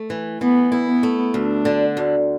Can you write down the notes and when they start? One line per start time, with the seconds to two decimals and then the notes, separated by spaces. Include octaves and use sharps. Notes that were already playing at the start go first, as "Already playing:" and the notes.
Already playing: A3
0.10 E3
0.41 E3 B3
0.72 E4
0.88 B3
1.03 A3
1.34 D2 D4
1.65 D3
1.97 D2